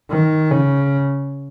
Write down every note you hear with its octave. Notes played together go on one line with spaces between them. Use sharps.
D#3
C#3